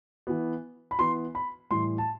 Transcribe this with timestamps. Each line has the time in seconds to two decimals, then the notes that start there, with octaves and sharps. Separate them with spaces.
0.27 E3 B3
0.91 B5
0.99 E3 B3 C6
1.35 B5
1.71 A2 E3 G3 C6
1.98 A5